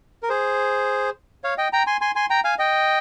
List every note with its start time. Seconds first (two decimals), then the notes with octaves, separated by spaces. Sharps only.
0.23 A#4
0.29 G#4 C5
1.44 C#5 F5
1.58 D#5 G5
1.73 G5 A#5
1.87 G#5 C6
2.01 G#5 C6
2.15 G#5 C6
2.30 G5 A#5
2.44 F5 G#5
2.59 D#5 G5